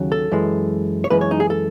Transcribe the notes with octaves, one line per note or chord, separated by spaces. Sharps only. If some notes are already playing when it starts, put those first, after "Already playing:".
Already playing: D#2 C#3 F#3
A4
F#2 E3 G#3
C#5
F#2 E3 G#3 B4
C#5
D#4
G#4
A4